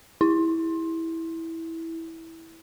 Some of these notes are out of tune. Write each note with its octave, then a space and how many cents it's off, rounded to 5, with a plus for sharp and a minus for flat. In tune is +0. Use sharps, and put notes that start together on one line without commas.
E4 -10